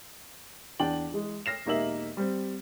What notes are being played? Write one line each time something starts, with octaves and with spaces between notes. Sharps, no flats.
E2 D4 G5 F#7
E3 G#3
F6 A#6 C7 E7
E1 A#3 D#4 G4 E5 F#7
G3 C4